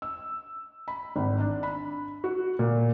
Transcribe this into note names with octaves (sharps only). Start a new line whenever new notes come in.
E6
B5
G#1
D4
B5
F#4
A#2